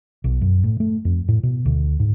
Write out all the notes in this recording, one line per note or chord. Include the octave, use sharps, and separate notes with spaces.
B1
F#2
A2
A3
F2
A2
B2
D2
G#2